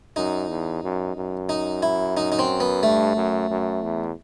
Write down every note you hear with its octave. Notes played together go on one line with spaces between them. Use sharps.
F#2 D#4
E2
F#2
F#2
D#4
E4
D#4
D#4
C4
B3
G2 A3
F#2
F#2
E2